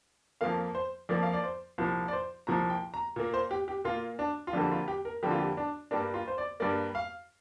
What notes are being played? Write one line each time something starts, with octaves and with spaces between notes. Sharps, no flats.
F2 F3 A#3 F5
C5
F2 F3 A#3 D5
F5
D5
C5
C2 A#2 F3
D5
C5
C2 A#2 F3 A#5
G5
A#5
A#2 A#3
C5
G4
G4
A#2 A#3 F4
D4
F4
F2 D3 G3 A#3 D4
F4
G4
A#4
F2 D3 G3 A#3 G4
F4
G4
D4
G2 G3 A#3 D4
F4
C5
D5
G2 G3 A#3 D5
F5